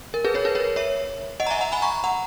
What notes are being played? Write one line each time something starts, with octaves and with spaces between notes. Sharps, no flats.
A#4
G#4 B4
A#4 C#5
G#4 B4
A#4 C#5
C#5 E5
D#5 F#5
A#5
E5 G#5
F#5 A#5
G#5 B5
A#5 C#6
F#5 A#5